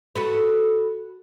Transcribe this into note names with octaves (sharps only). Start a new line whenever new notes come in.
F#4 A4 B4